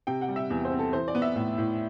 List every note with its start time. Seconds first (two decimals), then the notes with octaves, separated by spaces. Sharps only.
0.07 C3 G5
0.21 F#5
0.28 G3
0.36 E5
0.50 E2
0.65 C5
0.72 C4
0.79 A4
0.93 E3 C5
1.08 D5
1.15 B3
1.22 E5
1.36 A2
1.58 A2